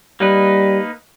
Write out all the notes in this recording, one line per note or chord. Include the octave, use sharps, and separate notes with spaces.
G3 A#3 D#4 B4